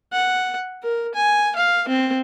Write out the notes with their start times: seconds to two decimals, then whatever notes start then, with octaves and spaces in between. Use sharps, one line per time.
0.13 F#5
0.83 A#4
1.14 G#5
1.56 F5
1.88 C4